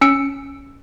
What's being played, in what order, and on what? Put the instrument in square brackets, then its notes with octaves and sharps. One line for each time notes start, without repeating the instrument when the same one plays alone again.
[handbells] C#4 E6 C#7 D7